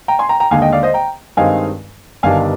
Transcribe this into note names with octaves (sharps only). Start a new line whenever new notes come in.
G5 A#5
G#5 C6
G5 A#5
G5 A#5
D#2 D3 G#3 F5 G#5
D#5 G5
D5 F5
C5 D#5
G5 A#5
G2 D#3 G#3 C4 D#4 F5 G#5
G1 G2 D#3 G3 D4 F5 G#5